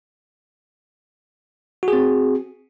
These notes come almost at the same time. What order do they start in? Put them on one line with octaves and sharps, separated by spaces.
F#4 G#4 C4